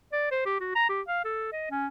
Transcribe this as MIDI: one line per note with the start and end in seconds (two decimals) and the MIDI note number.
0.13 0.29 74
0.31 0.43 72
0.46 0.60 67
0.60 0.73 66
0.76 0.86 82
0.89 1.01 67
1.08 1.22 77
1.25 1.51 69
1.52 1.67 75
1.71 1.87 61